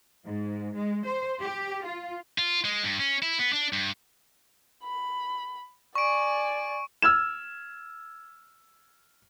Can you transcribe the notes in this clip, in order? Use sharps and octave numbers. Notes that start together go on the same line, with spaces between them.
G#2
G#3
C5
G4
F4
F4
G#3
G2
C#4
E4
B3
D4
G2
B5
D5 G#5 C#6 D7
E6 F6 G#6 E7